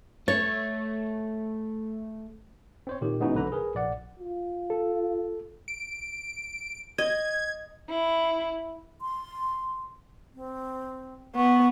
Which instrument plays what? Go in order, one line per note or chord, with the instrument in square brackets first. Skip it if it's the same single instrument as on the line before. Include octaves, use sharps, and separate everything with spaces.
[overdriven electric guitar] A3 [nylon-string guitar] C#5 [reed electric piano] A6
[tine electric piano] C4 C5 C#5
A#2 D#3 G4
G#3 B3 C#4 D#4 E4 F#4
B1 D3 B4 A#5
G#4 A#4 B4
A#1 D5 F#5
[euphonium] F4
[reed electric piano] A4
[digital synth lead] D7
[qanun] D#5 [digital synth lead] G#6
[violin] E4
[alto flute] C6
C4
[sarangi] B3 [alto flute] C#6